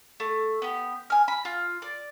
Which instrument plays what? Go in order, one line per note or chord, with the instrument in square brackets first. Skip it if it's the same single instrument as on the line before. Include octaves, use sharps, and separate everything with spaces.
[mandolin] A3
B3 G4
G#5 F6
B5
F4
D5